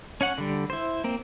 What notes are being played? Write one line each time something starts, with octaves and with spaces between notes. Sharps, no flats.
C#4 C#5 F#5
D3 G3
E4 C5
A#3 C4